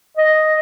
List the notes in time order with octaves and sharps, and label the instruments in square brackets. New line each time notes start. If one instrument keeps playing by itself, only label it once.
[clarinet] D#5